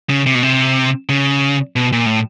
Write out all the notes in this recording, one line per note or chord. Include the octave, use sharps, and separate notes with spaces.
C#3
C3
B2
C3
C#3
B2
A#2
A2